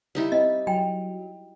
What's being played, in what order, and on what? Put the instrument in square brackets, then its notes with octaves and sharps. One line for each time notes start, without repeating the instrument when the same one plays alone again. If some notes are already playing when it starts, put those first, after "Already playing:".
[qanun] G3 D#4 E4
[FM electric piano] C4 [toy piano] D#5
[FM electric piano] F#3 [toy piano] G5